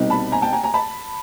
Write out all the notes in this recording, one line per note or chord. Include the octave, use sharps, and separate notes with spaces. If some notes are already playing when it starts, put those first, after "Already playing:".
Already playing: C2 B2 G3 C4 D#4
A5 B5
G#5 A#5
G5 A5
G#5 A#5
G#5 A#5
A5 B5